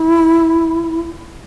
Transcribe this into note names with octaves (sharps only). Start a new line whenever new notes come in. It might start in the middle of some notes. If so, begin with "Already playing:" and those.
Already playing: E4